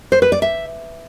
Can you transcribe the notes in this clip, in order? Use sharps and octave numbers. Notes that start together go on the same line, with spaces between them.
C5
B4
D5
E5